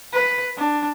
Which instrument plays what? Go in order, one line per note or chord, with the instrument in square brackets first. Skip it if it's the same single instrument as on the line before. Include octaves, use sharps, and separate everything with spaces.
[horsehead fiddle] B4
D4